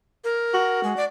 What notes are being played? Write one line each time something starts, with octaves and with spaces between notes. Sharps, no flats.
A#4
F#4
G#3
D5